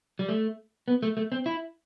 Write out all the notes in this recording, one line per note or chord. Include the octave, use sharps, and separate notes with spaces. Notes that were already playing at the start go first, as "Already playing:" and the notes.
G3
A3
B3
A3
A3
C4
E4